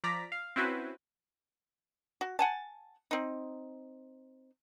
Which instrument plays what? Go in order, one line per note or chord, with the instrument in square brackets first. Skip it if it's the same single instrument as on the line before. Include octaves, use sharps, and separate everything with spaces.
[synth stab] F3 D5 A#5 B6
F5
C4 C#4 E4 F#4 B4 C5
[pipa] F#4
F#5 G#5 A5
C4 D#4